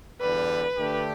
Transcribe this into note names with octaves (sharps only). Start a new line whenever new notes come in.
E2 D3 G3 B4
D3 A3 D4 G4